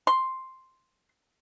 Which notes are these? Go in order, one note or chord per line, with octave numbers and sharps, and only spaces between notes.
C6